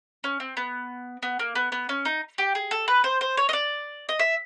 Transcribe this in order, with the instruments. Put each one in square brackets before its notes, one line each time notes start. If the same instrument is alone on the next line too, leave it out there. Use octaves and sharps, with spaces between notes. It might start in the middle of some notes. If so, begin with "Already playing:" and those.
[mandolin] C#4
C4
B3
B3
A#3
B3
B3
C#4
D#4
G4
G#4
A4
B4
C5
C5
C#5
D#5
D5
D#5
E5